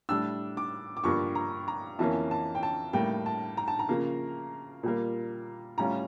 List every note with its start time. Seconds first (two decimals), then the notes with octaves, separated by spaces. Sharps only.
0.09 A2 G3 D4 E6
0.57 D6
0.97 D6
1.04 G2 F3 A#3 D4 C#6
1.35 A#5
1.68 A#5
1.99 F2 E3 A#3 C#4 A5
2.31 A5
2.55 G5
2.63 A5
2.93 A2 G3 A#3 G5
3.26 A5
3.57 A#5
3.68 A5
3.79 A#5
3.89 C#3 F3 A#3
4.83 A#2 G3 A#3
5.78 A2 G3 C#4 F4 A#5